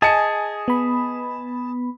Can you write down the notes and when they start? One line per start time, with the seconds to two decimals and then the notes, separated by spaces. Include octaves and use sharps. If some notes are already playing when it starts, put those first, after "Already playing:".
0.02 G#4 D#5 G#5 A5 C#7
0.68 B3 B5